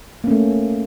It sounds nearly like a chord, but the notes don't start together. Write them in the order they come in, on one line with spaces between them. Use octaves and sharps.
A#3 C#4 A3